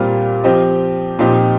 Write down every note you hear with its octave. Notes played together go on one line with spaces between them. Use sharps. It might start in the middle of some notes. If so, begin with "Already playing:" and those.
Already playing: A#2 G3 C4 F4 A#4
F3 C4 G4 D#5
A#2 F3 C4 D#4 G4